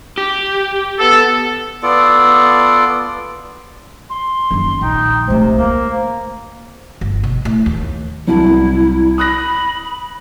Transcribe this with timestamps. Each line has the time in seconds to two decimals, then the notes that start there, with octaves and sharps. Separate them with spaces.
0.18 G4
0.99 B3 A4
1.83 B3 F4 A4 D5
4.10 C6
4.51 F#1 D#3
4.81 A#1 D#4 G5
5.27 C3 G#3 A3 C5
5.55 D2 A#3
7.01 G1
7.23 B2
7.45 A2
7.66 D#2
8.27 C2 F#3 E4 A5
9.18 B5 D#6 F#6 A#6